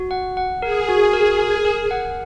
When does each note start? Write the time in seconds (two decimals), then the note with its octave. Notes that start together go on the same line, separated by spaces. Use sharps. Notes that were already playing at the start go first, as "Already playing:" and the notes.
Already playing: F#4
0.11 F#5
0.37 F#5
0.62 G#4 A#4
0.89 F#4
1.13 A#4
1.39 A#4
1.65 A#4
1.91 F#5